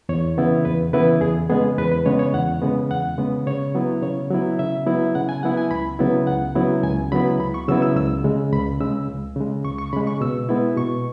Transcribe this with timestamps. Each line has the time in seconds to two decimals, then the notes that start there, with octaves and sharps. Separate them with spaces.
0.09 E2 C#5
0.38 C#3 E3 B3 E4
0.65 E2 B4
0.93 C#3 E3 B3 E4 B4
1.21 E2 G#4
1.49 C#3 G#3 B3 G#4
1.78 E2 B4
1.92 B4
2.06 C#3 G#3 B3 C#5
2.19 C#5
2.34 E2 F#5
2.62 C#3 G#3 B3
2.90 E2 F#5
3.18 C#3 G#3 B3
3.47 C#3 C#5
3.75 F#3 B3 E4
4.02 C#3 C#5
4.30 F#3 B3 E4
4.59 C#3 E5
4.87 F#3 B3 E4
5.15 C#3 F#5
5.29 G#5
5.43 F#3 B3 E4 F#5
5.57 G#5
5.71 C#2 B5
5.99 C#3 F#3 B3 E4
6.27 C#2 F#5
6.55 C#3 F#3 B3 E4
6.83 C#2 G#5
7.12 C#3 F#3 B3 E4 B5
7.40 C#2 B5
7.54 C#6
7.68 C#3 F#3 B3 E4 E6
7.82 E6
7.96 C#2 E6
8.24 C#3 G#3
8.53 C#2 B5
8.81 C#3 G#3 E6
9.09 C#2
9.36 C#3 G#3
9.65 C#2 C#6
9.78 C#6
9.93 C#3 B5
9.97 G#3
10.07 C#6
10.21 B2 E6
10.49 G#3 B3 E4
10.77 B2 C#6